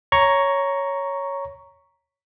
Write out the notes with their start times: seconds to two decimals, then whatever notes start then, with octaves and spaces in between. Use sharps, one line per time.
0.12 C#5 A#5 C#6